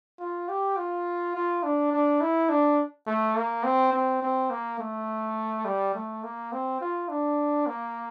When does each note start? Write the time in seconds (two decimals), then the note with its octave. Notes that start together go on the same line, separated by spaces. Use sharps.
0.19 F4
0.49 G4
0.77 F4
1.35 F4
1.63 D4
1.92 D4
2.21 E4
2.49 D4
3.07 A3
3.35 A#3
3.64 C4
3.93 C4
4.22 C4
4.50 A#3
4.79 A3
5.65 G3
5.94 A3
6.23 A#3
6.52 C4
6.81 F4
7.09 D4
7.67 A#3